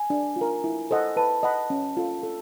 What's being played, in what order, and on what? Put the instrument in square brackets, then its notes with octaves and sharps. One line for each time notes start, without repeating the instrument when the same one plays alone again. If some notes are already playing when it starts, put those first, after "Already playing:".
Already playing: [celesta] G#5
[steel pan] D4
F4
A#4
E4
A4 C5 D#5 F#5
[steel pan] B4 [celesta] A5
[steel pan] D#5 F#5 B5
C#4
F4 A4
A4